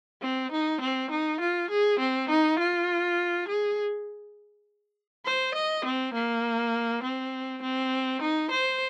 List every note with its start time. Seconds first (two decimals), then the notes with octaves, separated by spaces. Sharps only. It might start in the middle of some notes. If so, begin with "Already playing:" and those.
0.22 C4
0.52 D#4
0.81 C4
1.11 D#4
1.40 F4
1.70 G#4
1.99 C4
2.29 D#4
2.59 F4
3.48 G#4
5.25 C5
5.55 D#5
5.85 C4
6.14 A#3
7.03 C4
7.62 C4
8.22 D#4
8.51 C5